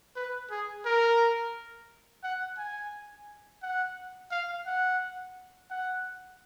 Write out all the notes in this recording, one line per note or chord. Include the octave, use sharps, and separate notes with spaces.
B4
G#4
A#4
F#5
G#5
F#5
F5
F#5
F#5